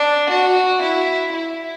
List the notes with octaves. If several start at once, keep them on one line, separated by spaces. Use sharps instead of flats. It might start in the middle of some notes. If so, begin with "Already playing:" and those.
Already playing: D4
F#4
E4
E4